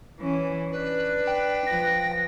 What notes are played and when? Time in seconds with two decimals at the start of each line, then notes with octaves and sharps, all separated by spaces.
0.20 E3 C#4
0.72 D4 B4
1.27 G5
1.67 F3 A#6